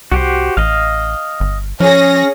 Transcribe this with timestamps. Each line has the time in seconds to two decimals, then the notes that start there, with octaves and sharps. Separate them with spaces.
0.12 C2 F#4 G4 C5
0.57 A1 D#5 F5
1.40 G1
1.80 F3 C#4 G#4 C#5 A#6